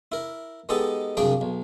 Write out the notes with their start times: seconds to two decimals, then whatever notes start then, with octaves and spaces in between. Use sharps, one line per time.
0.12 E4 A#4
0.69 G#3 B3 D#4 G4 A4
1.17 C2 F#2 C#3 D4 G#4 G5
1.41 B1